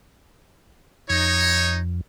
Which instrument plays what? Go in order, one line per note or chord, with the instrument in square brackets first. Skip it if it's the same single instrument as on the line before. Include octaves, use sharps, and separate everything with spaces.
[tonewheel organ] F2 [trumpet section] D#4 C#5